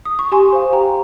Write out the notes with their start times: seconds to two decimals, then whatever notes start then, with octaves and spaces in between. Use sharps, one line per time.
0.05 D#6
0.19 C#6
0.32 G4 G#5 C6
0.53 C5 F5
0.73 G4 G5 A#5